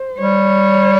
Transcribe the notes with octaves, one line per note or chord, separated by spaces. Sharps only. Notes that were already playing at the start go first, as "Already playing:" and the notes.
Already playing: C5
G3 C#5